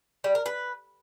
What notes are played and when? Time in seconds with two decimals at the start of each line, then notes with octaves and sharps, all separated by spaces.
0.24 G3
0.35 A#4
0.46 B4